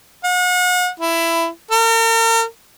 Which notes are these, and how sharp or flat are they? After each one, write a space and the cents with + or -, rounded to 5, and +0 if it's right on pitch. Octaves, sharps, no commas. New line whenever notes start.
F#5 -40
E4 +15
A#4 -40